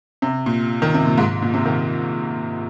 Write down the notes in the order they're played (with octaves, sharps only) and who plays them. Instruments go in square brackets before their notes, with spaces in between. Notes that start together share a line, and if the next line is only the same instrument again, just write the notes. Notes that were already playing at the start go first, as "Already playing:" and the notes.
[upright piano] C3
A#2
D#3
C3
A#2
G#2
A#2
C3
D#3